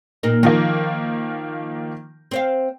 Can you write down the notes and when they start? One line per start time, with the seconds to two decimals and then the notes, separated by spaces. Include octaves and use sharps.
0.23 A#2 A#3 D#4
0.43 D#3 F3 A#3 D#4
2.31 C4 C5 F5